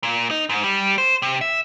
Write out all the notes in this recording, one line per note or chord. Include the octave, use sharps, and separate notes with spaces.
A#2
D#4
G#2
G3
C5
C3
E5